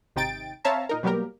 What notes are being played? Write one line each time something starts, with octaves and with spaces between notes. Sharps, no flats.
G#1 C3 D#4 G5 A6 D7
C4 C#5 E5 F5 A5 A#5
A#2 D#4 A#4
B2 F#3 G3 A#3 G4 A#4